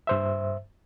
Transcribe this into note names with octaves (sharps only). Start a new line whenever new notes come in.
G2 C5 E5